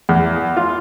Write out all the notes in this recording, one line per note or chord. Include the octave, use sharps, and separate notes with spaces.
E2
F4